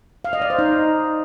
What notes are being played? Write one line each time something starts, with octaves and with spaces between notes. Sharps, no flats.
F5
D#5
D5
C5
D#4